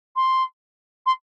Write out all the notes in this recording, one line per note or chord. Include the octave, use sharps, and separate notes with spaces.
C6
C6